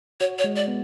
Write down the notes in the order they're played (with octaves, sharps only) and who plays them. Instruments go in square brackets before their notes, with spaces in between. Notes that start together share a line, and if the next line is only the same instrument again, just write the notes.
[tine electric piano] F#4 [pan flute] C#5
[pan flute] C#5
[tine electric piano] G#3
[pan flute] D5
[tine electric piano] B3